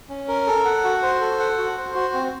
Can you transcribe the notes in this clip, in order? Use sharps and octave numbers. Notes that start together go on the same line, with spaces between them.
C#4
A#4
A4
F#5
F#4
C5
A4
F#5
F#4
C5
F#4
C4